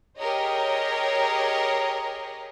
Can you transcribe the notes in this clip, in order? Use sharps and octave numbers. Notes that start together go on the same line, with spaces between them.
G4 G#4 A#4 C#5 D#5